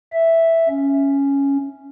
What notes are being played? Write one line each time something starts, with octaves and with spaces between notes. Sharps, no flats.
E5
C#4